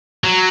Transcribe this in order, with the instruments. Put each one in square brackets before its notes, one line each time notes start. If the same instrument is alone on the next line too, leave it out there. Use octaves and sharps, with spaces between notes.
[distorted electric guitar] F#3